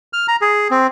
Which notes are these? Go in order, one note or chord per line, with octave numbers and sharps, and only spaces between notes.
F6
A#5
G#4
C4